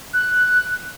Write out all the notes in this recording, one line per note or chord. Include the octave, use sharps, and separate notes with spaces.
F#6